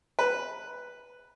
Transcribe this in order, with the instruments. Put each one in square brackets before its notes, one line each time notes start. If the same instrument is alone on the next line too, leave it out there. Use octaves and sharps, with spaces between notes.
[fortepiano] B4